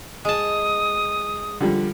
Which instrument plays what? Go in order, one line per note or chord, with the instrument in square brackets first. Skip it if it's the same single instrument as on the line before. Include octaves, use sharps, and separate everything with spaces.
[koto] G#3 A5 [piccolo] D#6
[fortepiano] D3 F3 G3